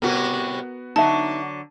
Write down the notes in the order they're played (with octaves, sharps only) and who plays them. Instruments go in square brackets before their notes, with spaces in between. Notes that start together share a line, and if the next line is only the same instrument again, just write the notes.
[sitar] A2 C3 G3 [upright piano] B3 F#4 [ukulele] A#4
[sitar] D3 F#3 [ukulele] D#4 E5 [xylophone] A5